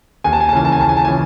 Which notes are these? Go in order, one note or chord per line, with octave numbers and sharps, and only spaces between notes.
D#2 G#5
A5
G#5
A5
C#3 E3 G#5
A5
G#5
D#2 A5
G#5
A5
C#3 E3 G#5